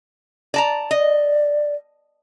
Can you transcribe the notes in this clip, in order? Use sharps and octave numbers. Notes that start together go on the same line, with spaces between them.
D5 A5 A#5
D5 D#5